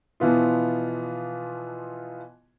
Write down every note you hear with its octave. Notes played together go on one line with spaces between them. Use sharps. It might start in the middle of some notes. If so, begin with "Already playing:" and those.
B2 E3 F3 B3 F4